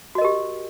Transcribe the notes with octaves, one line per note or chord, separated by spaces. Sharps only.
F#4 G4 A#4 D#5